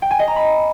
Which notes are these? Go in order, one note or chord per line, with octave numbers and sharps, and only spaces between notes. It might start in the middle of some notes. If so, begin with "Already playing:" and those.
G5
G#5
D#5
A#5
B5